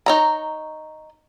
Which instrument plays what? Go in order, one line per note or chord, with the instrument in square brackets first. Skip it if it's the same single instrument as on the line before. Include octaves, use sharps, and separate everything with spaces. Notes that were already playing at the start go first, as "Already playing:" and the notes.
[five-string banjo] D#4 C#5 A#5